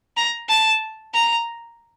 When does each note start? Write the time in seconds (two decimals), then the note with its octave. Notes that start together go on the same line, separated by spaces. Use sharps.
0.17 A#5
0.49 A5
1.14 A#5